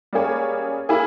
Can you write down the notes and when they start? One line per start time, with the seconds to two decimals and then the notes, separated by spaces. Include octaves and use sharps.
0.13 G3 A#3 C#4 G#4 C#5
0.89 A#3 E4 G#4